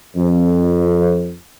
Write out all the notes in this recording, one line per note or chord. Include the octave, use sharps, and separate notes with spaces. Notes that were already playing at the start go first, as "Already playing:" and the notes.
F2